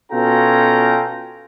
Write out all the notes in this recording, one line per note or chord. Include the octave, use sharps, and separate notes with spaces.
B2 C#4 F4 A4 G5 A#5